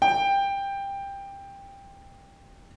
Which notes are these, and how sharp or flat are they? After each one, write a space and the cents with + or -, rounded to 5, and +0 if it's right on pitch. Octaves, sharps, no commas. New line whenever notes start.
G5 +15